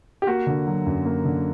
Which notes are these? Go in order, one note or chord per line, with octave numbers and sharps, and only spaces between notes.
G4
A#3 F#4
D3
F#3
F#2
A#3
D3